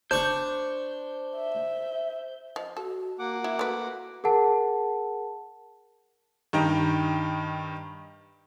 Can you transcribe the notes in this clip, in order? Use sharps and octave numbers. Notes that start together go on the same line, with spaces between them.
D4 C5 C#6 G6
E5
F3 D#5
F#4 A4
A#3 F#5 D6
E4 E5
A3 F#4 B4
G#4 A#4 F#5 A5
G2 D#3 D#4 G4 G5 A#5